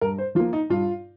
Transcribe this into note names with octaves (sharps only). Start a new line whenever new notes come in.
G2 A#4
C5
F3 A#3 F4
D#4
G2 F4